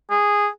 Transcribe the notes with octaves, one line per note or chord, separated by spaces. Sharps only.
G#4